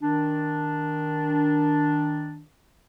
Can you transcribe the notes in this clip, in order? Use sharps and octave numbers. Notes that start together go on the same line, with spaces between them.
D#3 D4